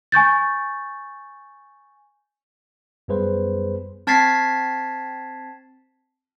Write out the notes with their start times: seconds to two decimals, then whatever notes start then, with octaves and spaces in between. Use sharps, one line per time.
0.12 G#5 C#6 G6 A6
3.08 F#2 G3 B3 G#4 B4 C5
4.07 C4 A5 G#6 A6 B6 C7